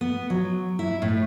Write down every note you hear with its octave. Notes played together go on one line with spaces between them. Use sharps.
B3
F#3
E4
A2